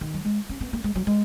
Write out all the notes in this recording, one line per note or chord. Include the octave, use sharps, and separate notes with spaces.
D#3
F#3
G#3
C#4
B3
A#3
G#3
F#3
G#3